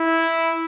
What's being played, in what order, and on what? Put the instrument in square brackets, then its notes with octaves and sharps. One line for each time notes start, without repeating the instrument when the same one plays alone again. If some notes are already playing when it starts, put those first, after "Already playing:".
Already playing: [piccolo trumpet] E4